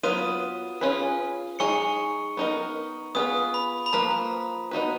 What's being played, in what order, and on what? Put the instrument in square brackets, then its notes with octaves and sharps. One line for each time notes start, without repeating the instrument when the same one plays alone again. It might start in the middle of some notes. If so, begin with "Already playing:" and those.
[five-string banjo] F#3 B3 F4 B4 [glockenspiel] D#6 D#7
[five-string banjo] C#4 F4 G#4 B4
[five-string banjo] G#3 D#4 G#4 [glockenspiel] C#6 C#7
[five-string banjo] B3 D#4 A#4
[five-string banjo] B3 F4 G#4 B4 [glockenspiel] D#6
[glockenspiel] B5
B5
[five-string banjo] F3 A#3 F4 B4 [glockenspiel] A#5
[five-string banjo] B3 D#4 F#4 B4